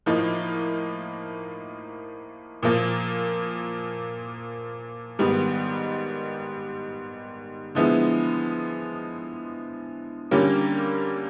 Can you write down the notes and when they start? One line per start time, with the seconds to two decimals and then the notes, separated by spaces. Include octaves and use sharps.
0.06 A2 F3 A#3 D#4
2.63 A#2 F3 A#3
5.19 G#2 D#3 G3 B3 D#4
7.75 D3 F3 G#3 B3 E4
10.31 D3 G3 A#3 C#4